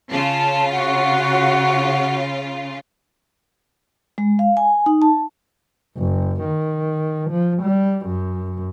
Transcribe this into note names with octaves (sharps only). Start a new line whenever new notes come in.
C#3 F4 A5
F#4 F#5
G#3
F5
G#5
D#4
A5
F#1
D#3
F3
G3
F#2